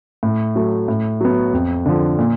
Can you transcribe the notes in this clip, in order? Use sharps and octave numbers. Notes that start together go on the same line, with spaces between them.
A2
F#3 A3
A2
F#3 B3
F2
D3 F3
A#2